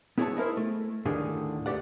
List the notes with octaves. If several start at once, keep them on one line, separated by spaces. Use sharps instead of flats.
B3 E4 G#4 A4 C#5 A5
D#4 E4 A#4 C5
A3
D#2 A2 D3 D#3 D4 G#4
C#2 A3 G4 D5 F#5